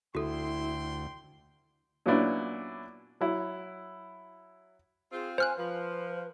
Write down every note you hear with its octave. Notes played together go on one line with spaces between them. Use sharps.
D2 E4 F#4 A4 G5 C6
A#2 F#3 B3 C#4 D4 E4
F#3 E4
C4 F4 G#4
C5 G#5 F6 F#6
F3 B4